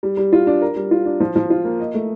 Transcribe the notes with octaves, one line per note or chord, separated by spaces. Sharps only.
G3
G3
F4
D4
A#4
G3
F4
D4
F3
F3
F4
A#3
D#5
A3